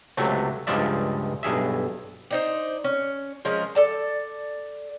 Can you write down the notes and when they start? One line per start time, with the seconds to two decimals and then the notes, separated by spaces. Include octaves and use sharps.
0.17 C#2 C3 F#3 A3
0.67 C#2 G2 F3 G#3 D5 E5
1.43 B1 G2 G#4 E5
2.31 D4 D#4 C5
2.84 C#4
3.45 F3 G#3 C#4 A#4
3.75 A4 D5 A5